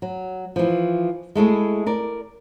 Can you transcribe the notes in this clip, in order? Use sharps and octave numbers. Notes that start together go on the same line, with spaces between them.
F#3
E3 F3
G#3 A3 E4 G#4
A#4 D5